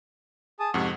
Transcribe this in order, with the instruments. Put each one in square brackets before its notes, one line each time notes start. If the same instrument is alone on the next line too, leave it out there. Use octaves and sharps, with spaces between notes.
[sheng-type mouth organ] G#4 A5 D#6
[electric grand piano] F2 G#2 C3 [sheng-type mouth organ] F#5 C#6